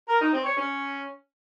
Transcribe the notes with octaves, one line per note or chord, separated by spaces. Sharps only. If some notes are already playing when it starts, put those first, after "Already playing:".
A#4
D#4
C4
C#5
C#4